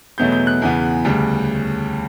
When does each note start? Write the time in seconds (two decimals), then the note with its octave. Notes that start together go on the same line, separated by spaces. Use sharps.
0.18 E2 B2 F#3 A3 G6
0.32 G6
0.47 F#6
0.62 E2 C#3 E3 B3
1.05 D2 C#3 G3